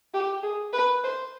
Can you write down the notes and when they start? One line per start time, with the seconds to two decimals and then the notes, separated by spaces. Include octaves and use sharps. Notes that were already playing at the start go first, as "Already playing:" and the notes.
0.14 G4
0.43 G#4
0.73 B4
1.04 C5